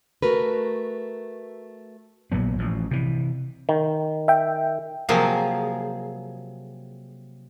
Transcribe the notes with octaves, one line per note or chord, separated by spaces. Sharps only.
A3 F#4 A#4 B4
A#1 A#2 F#3 B3
A1 F3
C3 E3
D#3
E5 G5
C3 F3 F#3 A#3 G#4